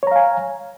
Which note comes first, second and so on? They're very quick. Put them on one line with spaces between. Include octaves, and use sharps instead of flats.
C#5 A#5 F5 G#5